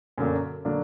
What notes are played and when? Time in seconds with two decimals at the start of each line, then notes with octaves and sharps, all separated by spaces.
0.18 F#2 D3 F#3 A#3 D4
0.65 D3 F#3 A#3 D4